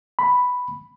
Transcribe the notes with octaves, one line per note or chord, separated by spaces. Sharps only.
B5